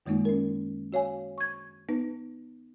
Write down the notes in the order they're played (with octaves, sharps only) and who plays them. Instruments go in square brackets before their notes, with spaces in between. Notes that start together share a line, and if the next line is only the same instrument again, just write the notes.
[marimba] F#2 D#3 G#3 A#3 D#4 F4
C#4 A#4
F#4 C#5 F5 G#5
C#6 G#6
B3 D#4 B4